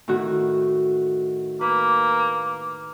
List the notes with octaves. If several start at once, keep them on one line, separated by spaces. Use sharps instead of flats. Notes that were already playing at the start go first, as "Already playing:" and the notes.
A2 D#3 F#4
A#3 B4